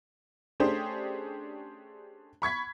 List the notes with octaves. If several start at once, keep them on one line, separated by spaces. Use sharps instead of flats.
A3 C#4 D4 G4 G#4 C5
B5 C#6 G#6 B6